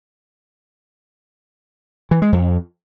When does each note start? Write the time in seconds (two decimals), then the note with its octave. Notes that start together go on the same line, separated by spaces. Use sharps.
2.11 E3
2.22 G#3
2.32 F2